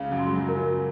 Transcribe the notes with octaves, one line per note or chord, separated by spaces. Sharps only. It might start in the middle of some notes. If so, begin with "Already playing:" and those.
Already playing: C#2 C#3 F5
F#2 F#3
C6
G#3
F#2 F#3
A#4
F#2 F#3